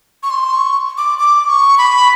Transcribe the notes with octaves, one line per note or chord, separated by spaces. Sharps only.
C#6
C6
C#6
D6
D6
C#6
B5